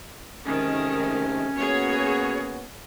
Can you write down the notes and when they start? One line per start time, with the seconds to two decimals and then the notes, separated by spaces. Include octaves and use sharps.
0.47 G#2 C3 D#3 A3 C#4
1.56 A#3 B3 F#4 G#4 C#5